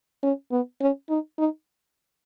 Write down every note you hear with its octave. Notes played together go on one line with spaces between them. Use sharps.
C#4
B3
C#4
D#4
D#4